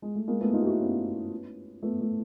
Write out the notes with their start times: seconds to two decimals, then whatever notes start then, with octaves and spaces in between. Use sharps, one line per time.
0.02 G#3
0.15 A3
0.28 G#3 A#3
0.41 A3 B3
0.53 D#4 F4
0.62 G4
0.66 E4 F#4
0.80 B3 C#4
1.82 A3 B3
2.01 A3